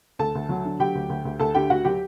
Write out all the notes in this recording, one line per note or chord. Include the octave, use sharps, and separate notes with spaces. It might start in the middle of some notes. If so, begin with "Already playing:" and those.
D2 A4 A5
D2
F#3
D3
F#3 G4 G5
D2
D2
D2
D2 A4 A5
D3 G4 G5
D2 F#4 F#5
F#3 G4 G5